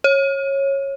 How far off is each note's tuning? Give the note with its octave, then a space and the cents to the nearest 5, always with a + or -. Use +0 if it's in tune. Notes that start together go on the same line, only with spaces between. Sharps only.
C#5 -15